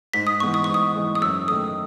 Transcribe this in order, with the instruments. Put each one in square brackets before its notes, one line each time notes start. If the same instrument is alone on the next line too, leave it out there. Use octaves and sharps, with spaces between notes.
[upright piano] G#2 [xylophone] B6
[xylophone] D#6
[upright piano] E3 G#3 B3 D#4 [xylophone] C#6
[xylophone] D#6
[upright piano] G#2 [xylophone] C#6
[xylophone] D#6
[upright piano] E3 G#3 B3 D#4
[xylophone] D#6
[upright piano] F#2 [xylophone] E6
[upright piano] A3 [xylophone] D#6
[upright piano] D#3